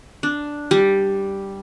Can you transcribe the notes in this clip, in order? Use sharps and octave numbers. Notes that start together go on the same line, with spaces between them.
D4
G3